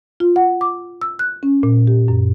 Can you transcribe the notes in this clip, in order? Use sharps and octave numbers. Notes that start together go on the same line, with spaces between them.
F4
F#5
D6
E6
F#6
C#4
A#2
G4
F#2